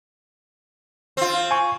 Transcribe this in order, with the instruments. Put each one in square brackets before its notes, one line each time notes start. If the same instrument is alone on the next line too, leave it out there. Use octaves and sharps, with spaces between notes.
[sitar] C4 F4
[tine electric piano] G#5 C#6